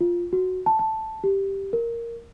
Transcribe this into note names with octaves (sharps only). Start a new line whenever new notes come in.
F4
F#4
A5
A5
G4
A#4